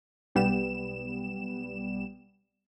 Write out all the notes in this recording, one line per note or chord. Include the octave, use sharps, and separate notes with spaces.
B1 G3 B3 E7